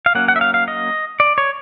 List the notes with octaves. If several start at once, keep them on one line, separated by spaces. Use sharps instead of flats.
F5
F#3 A#3 C#4 F#5
F#5
E5
F5
F5
D#5
D5
C#5